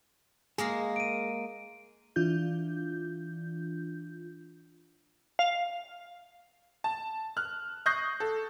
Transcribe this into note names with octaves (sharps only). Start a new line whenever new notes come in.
G#3 A#3 G#4 A#4
D7 D#7
E3 D4 F4 G6
F5
A5
F6 F#6
C#6 D#6 F#6 G6 A#6 C7
A4